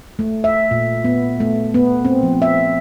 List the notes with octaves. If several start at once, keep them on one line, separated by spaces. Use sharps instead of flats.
A3
E5
A#2
B3
A3
B3
C4
F3
E5